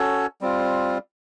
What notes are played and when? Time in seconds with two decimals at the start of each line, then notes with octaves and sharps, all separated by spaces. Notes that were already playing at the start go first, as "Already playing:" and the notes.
Already playing: C#4 F#4 A4 C#5
0.41 G3 C4 F4